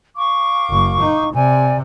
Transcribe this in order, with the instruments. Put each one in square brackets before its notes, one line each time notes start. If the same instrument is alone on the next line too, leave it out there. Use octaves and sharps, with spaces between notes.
[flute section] F5 C#6 D6
[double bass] F#1
D#4
[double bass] C3 [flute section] D5 G#5